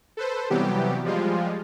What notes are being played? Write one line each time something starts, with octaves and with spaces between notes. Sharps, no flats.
A4 B4 C5
C3 E3 F#3 G3 B3 G4
F3 G3 G#3 F4